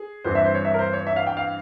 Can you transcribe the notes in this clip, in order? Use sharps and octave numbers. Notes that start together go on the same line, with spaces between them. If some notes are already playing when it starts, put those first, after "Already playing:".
Already playing: G#4
G2 E3 G3 C4 C5
E5
C5
C#5
E5
A#4
C5
C#5
E5
F5
G5
F5